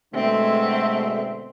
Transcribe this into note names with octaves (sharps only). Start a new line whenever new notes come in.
B2 D3 G#3 A3 C4 E5